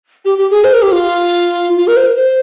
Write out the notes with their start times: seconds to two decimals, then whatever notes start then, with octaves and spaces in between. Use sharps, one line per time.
0.25 G4
0.38 G4
0.50 G#4
0.64 C5
0.73 A#4
0.82 G4
0.92 F4
1.77 F4
1.87 A#4
1.97 C5
2.06 A#4
2.16 C5